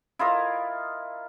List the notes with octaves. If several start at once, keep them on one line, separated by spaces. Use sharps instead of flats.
E4 F4 A#4 D#5